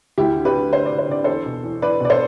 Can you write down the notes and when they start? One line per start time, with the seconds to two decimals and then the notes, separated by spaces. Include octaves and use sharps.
0.18 D2 E4 G4
0.36 D3
0.45 G4 B4
0.54 D3
0.73 D3 C5
0.86 D5
0.91 D3
0.98 C5
1.09 D3 D5
1.24 E2 A4 C5
1.46 B2
1.64 E2
1.82 E2 B4 D5
2.00 B2 D5
2.10 A4 C5